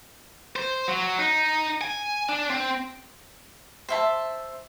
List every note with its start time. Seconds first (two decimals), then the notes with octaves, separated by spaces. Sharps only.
0.56 C5
0.87 F#3
1.18 D#4
1.81 G#5
2.29 D4
2.50 C4
3.89 C5 E5 A5